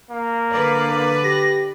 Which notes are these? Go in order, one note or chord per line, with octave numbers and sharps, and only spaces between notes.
A#3
D3 B4 D5
G4 A#6